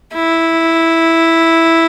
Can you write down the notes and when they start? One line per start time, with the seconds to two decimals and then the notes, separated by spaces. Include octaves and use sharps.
0.14 E4